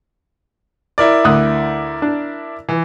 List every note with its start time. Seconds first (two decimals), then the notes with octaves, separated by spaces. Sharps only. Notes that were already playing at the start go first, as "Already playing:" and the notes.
0.98 E4 A#4 D5
1.24 D2 D#6 F#6
2.02 D4
2.69 E3